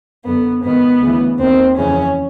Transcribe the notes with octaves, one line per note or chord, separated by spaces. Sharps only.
F#2 D3 B3
G#2 D#3 B3
D2 C#3 E3
D#2 D#3 C4
F2 C#3 E3 C#4